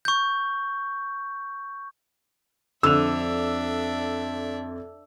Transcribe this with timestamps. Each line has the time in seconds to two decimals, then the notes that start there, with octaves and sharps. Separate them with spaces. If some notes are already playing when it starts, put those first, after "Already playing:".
0.05 C#6 G6
2.83 F2 D3 D4 E5 E6 F7